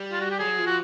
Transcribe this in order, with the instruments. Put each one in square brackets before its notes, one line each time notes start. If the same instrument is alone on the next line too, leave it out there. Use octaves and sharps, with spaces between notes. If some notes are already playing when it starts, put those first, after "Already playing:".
Already playing: [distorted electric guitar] G3
[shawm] F4
F#4
G4
[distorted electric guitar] F#3 [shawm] G#4
[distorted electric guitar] F3
[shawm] F#4